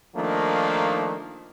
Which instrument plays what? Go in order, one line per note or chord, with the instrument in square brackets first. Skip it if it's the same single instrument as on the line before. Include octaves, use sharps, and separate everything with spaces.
[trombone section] D#3 F3 A3 A#3 D4 D#4